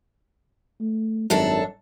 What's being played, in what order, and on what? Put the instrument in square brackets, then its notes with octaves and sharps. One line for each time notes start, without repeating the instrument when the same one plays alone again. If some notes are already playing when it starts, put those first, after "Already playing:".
[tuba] A3
[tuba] G#1 [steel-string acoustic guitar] F#2 D4 A4